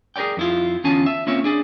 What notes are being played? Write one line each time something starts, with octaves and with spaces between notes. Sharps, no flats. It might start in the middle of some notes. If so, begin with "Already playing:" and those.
G#4 A#4 C#5 D5 G5
F2 E4 F4
E2 D3 C#4 F4 G#5 A5
E5
A#3 C4 C#4 F4 C#5 E5
D4 G#4 D5